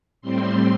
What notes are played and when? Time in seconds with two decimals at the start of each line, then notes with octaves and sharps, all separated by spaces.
0.21 A2 G3 C4 C6